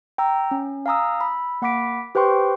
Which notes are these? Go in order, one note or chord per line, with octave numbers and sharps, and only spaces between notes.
G5 A#5 E6
C#4
F5 G#5 A#5 D#6 E6
B5 E6
A#3 F#5 B5 D6 B6 D7
G4 B4 C5 G5 C6 C#6